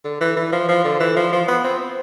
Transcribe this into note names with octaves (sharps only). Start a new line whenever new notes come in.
D3
E3
E3
F3
F3
D3
E3
F3
F3
B3
C4